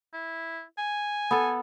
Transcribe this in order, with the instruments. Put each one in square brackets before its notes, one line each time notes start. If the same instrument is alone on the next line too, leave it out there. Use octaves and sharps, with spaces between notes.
[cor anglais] E4
G#5
[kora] B3 A4